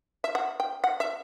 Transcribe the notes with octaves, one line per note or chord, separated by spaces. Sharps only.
E5
F#5
G5
F#5
E5